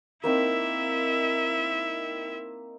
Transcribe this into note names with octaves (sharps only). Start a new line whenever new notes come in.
A#3 C4 D#4 E4 E5